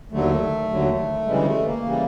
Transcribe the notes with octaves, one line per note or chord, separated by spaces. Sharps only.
D#2 D3 F#3 A3
D#2 D3 F#3
D2 C#3 E3 G3 G#3
A3
A#3
C#3 E3 G3